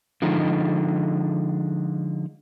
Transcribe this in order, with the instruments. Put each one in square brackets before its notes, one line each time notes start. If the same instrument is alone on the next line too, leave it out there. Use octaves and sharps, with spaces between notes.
[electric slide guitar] D3 F3 G#3 D#4